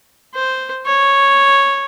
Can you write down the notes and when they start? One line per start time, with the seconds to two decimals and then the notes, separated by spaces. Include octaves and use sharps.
0.35 C5
0.86 C#5